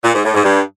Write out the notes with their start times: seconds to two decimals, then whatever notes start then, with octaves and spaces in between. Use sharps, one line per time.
0.04 A#2
0.14 G#2
0.24 A2
0.34 G#2
0.44 G2